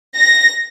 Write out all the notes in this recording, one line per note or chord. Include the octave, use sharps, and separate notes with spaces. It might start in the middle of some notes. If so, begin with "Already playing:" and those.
A#6